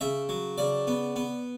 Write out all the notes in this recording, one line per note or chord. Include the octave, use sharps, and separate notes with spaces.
C#3 E5
F#3
C#3 D5
B3
B3